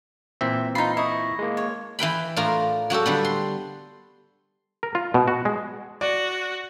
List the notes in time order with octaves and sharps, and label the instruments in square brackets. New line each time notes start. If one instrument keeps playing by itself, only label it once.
[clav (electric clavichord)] A#2 E3 C4 [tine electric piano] E5
[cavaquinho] D#4 B5 [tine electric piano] F4 C7
[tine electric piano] E4 C#6 [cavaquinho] D#5
[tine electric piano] G#3 A#3
[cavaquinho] C#5
[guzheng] E3 B4 G5 B5
A2 D4 F4 A#4 A#5
F#3 F#4 G4 A4
D3 G3 B3
C6
[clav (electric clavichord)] A#4
F4
B2
F#4
G#3
[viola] F#4 [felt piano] D5